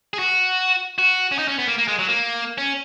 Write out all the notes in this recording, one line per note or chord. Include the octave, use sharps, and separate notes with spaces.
G#4
F#4
F#4
C#4
D#4
C#4
B3
A#3
A#3
G#3
F#3
A#3
C#4